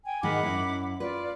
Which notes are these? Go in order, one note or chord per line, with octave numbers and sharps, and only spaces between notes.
G5 G#5
G#2 D#3 G#3 F#5 B5 D6
F#2 E4
F4 B4 D5